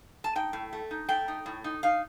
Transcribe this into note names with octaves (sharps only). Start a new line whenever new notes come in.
A5
D#4 G5
A2
A3
D#4
A3 G5
D#4
A2
D#4
D#4 F5